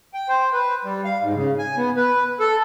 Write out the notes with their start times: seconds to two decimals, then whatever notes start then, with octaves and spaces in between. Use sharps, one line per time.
0.14 G5
0.28 C5
0.53 B4
0.85 G3
1.05 F5
1.22 G#2
1.35 C#3
1.59 G#5
1.77 B3
1.96 B4
2.40 A4